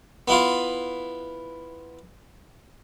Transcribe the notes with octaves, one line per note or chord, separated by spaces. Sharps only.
B3 E4 F4